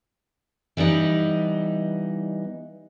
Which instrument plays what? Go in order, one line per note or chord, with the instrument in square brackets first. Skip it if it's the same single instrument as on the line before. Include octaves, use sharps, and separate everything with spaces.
[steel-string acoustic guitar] E3 G3 B3 D#4